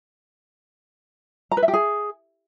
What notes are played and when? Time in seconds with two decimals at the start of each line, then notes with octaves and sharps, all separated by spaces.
1.51 A#5
1.57 B4
1.62 E5
1.68 G4
1.73 G#4